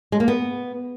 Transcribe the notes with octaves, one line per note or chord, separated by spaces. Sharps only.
G#3
A#3
B3